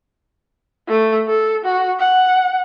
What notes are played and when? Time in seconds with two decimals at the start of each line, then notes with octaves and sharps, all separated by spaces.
0.88 A3
1.28 A4
1.65 F#4
2.00 F#5